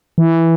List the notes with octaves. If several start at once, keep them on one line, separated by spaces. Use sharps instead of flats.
E3